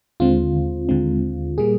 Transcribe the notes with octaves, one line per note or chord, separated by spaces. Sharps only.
D#2 D3 G#3 C4 F4
D#2 D3 G#3 C4
A#2 G3 A#3 G#4